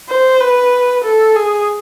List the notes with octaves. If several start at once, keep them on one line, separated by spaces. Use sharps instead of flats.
C5
B4
A4
G#4